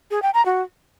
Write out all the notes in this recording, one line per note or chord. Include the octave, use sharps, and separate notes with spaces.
G#4
G5
A#5
F#4